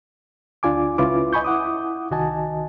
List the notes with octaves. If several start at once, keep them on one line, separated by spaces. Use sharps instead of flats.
D2 D4 F4 G#5 D6
C#2 C#4 E4 F4 B4 D6
D#5 G#5 B5 C#6 G6
E4 F#5 D6 D#6
C2 D#3 F#4 D#5 G#5 A5